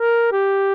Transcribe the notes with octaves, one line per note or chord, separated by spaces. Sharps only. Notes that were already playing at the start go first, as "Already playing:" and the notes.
Already playing: A#4
G4